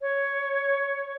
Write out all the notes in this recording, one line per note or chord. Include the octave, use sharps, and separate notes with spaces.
C#5